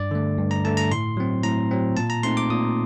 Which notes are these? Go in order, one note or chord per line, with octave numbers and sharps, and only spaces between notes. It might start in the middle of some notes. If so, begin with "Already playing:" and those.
Already playing: G2 D5
D3 A3
G2
A#5
D3 A3 A5
A#5
A2 C6
F#3 C4
A2 A#5
F#3 C4
A#2 A5
A#5
A3 C4 D#4 C6
D6
A#2 D#6